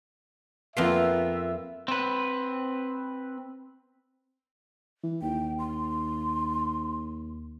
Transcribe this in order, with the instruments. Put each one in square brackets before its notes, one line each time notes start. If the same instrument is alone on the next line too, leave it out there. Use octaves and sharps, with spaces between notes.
[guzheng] F2 B4 C6 [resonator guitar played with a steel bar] A#3 B3 F4 [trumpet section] E5
[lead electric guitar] C4 B4
[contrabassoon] E3
[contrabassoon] D#2 [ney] G5
[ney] C6